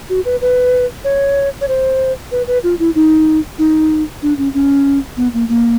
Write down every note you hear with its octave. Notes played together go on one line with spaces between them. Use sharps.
F#4
B4
B4
C#5
C#5
C5
B4
B4
F4
E4
D#4
D#4
D4
C#4
C#4
B3
A#3
A#3